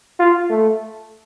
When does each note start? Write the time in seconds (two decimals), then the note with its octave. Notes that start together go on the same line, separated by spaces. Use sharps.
0.20 F4
0.50 A3